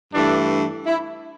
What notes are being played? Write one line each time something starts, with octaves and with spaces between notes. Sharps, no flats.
G2 E3 A3 D4
E4